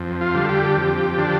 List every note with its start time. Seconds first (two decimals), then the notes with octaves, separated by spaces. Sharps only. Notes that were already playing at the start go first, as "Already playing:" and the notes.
Already playing: F2
0.21 F4
0.35 D3 G3
0.45 A4
0.49 G4
0.76 F2 G4
1.18 D3 F3 D4